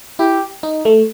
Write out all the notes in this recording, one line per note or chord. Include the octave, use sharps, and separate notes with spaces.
E4 G4
D#4
A3